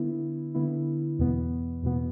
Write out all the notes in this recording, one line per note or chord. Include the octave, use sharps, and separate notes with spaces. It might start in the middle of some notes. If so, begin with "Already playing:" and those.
Already playing: D3 B3 E4
D3 B3 E4
E2 B2 B3
E2 B2 B3